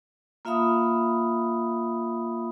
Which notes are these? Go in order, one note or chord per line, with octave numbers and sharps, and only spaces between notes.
A#3 F4 E5 F5 B5 D#6